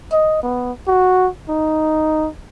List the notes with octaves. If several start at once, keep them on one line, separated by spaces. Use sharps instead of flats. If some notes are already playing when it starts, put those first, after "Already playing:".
D#5
B3
F#4
D#4